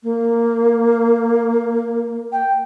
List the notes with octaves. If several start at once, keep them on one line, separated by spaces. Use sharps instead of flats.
A#3
G5